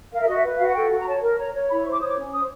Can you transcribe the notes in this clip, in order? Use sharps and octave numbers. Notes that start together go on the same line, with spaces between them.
A#4 F5
E5
F#4 D#5
E5
B4
F#4 F5
F#5
A4 G5
F#4
A#5
C#5 A5
A#4
C#5 A#5
C#5
E4 B5
C#6
C5 D6
C#5 D#6
D6
C#4
C5 D#6